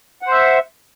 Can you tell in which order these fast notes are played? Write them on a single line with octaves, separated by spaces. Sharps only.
F#5 C5 E5